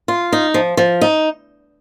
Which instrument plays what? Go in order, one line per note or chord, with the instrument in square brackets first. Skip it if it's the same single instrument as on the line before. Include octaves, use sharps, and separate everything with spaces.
[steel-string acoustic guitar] F4
D#4
F3
F3
D#4